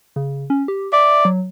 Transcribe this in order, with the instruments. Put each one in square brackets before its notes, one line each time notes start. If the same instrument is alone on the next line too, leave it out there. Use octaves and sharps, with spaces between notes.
[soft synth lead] C#3
C#4
G4
[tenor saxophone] D5 [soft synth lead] E5
[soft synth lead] F#3